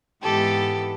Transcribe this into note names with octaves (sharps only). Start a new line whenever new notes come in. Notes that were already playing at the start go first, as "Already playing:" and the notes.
G#2 E3 G#3 B3 G4 A4